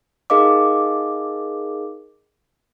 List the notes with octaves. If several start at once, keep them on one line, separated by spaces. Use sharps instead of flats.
D#4 G#4 A#4 D#5 F5 D6